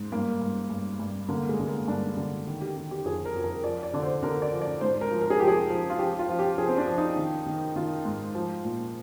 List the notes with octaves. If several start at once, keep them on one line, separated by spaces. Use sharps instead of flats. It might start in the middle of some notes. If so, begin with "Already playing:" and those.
Already playing: G#2
G2 A#3
G2
G2
G2
D3 A#3
G#3
D3
A#3
G2 D4
D3
D#3
G4
D#3
G4
F2 G#4
A#4
F2
A#4
F3 D5
D5
D3 D5
C5
D3 A#4
D5
F3
D5
G#2 C5
A#4
F3
A#4
G#4
F3 G4
G#4
F3
F4
F3 G4
F4
F3
G4
F3 G#4
C4
D4
F3
D#4
D#3
D#3
D#3 F4
G#2
F3
A#2